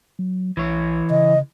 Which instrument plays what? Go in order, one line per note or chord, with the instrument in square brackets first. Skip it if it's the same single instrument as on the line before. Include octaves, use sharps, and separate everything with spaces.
[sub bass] F#3
[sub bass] B1 [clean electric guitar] E3 C#5
[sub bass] C#3 [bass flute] D#5